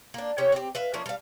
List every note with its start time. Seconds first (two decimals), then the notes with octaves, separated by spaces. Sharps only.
0.14 A#3 D4
0.38 C3 C#4 C#5 G5
0.52 C4 G4
0.75 B4 E5 F5
0.94 F3 A#3 C#4 D4
1.06 G3 F5